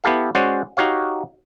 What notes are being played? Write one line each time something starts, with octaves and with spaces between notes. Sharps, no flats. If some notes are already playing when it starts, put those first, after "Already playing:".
B3 E4 G4 A4 F5
G#3 C#4 F#4 C5 D5 F#5
D#4 F#4 G4 C#5 F5